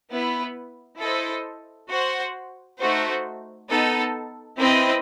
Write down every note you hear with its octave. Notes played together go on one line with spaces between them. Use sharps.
B3 E4 B4
E4 A4 C5 D#5
F#4 C5 F#5
A3 D#4 F#4 C5
B3 D#4 A4
C4 E4 B4 D#5